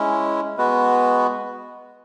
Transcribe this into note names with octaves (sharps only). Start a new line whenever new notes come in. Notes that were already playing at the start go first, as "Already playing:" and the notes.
Already playing: G#3 C#4 E4
G#3 B3 F#4 B4